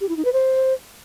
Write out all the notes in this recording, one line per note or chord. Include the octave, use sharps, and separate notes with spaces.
G4
E4
D#4
B4
C5